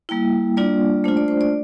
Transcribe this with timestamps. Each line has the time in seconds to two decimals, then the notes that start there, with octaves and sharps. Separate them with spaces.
0.09 G3 A#3 E4 G5
0.57 G3 A#3 D4 F4 D5
1.04 A3 D4 F4 C5
1.17 D5
1.28 C5
1.41 D5